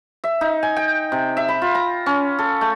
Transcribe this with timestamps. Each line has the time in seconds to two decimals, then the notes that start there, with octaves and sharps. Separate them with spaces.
0.24 E5
0.41 D#4
0.63 G#5
0.77 G5
1.12 C3
1.37 E5
1.49 B5
1.62 F4
1.75 A#5
2.06 C#4
2.39 A4
2.61 A3